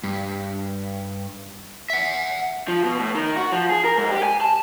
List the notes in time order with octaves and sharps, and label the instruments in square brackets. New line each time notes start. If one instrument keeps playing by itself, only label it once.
[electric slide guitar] G2
E5 F#5
[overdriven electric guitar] F3
B2
A2
D#3
F#4
F3
G#4
A#4
G#2
G4
G#5
A5